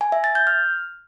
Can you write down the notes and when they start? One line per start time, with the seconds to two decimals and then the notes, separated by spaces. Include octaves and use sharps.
0.01 G#5
0.12 E5
0.24 A6
0.35 G6
0.47 F6